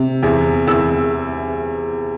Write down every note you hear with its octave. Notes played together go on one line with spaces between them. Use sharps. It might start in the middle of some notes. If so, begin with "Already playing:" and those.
Already playing: C3
E2
E2 E6